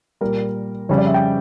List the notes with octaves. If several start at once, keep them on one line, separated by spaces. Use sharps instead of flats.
A#2 G3 A#4
F2 C#3 G3 C#5
D5
E5
G5